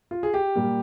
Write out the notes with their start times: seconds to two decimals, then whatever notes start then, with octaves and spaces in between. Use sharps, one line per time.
0.11 F4
0.23 G#4
0.34 G4
0.55 A#2 G3 A#3